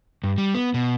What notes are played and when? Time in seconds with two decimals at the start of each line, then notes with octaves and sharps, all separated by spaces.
0.24 G2
0.38 G3
0.55 B3
0.74 B2